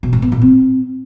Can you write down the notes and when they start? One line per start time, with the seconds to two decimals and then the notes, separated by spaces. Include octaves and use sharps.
0.03 B2
0.13 G#2
0.22 B3
0.32 A#2
0.42 C4